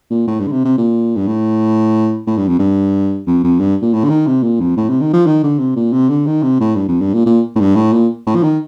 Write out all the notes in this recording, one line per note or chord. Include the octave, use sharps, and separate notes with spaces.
A#2
A2
G2
D3
C3
C3
A#2
G2
A2
A2
G2
F2
G2
F2
F2
G2
A#2
A2
D3
D#3
C3
A#2
F2
A2
C3
D#3
F3
D#3
D3
C3
A#2
C3
D3
D#3
C3
A2
G2
F2
G2
A#2
A#2
A2
G2
A2
A#2
A2
F3
D#3